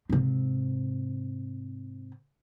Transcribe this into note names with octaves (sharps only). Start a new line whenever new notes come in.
G#2 C3